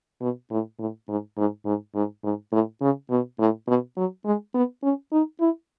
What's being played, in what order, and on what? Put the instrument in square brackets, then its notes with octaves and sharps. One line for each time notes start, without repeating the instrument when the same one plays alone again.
[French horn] B2
A2
A2
G#2
G#2
G#2
G#2
G#2
A2
C#3
B2
A2
B2
F#3
G#3
B3
C#4
D#4
E4